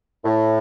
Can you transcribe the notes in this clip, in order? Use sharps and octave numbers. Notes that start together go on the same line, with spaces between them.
A2